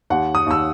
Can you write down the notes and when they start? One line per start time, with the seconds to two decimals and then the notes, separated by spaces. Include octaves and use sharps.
0.10 D#2 F#5
0.35 D#6
0.47 D#2 E6